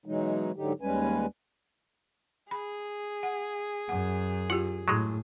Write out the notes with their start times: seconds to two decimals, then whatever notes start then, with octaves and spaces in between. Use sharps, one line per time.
0.06 B2 E3 F#3 G#3 D#4
0.56 G#2 D3 F#3 D#4 G4
0.81 D#2 G3 G#3 C#4 B4 G#5
2.51 G#4 B5
3.23 F#5
3.89 F#2 F#5
4.50 E4 F4 G4 F#5
4.88 A2 F#3 G#3